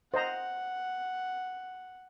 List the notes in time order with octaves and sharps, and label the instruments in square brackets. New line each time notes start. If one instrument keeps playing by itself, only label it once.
[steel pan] C5 D#5 A#5 [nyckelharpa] F#5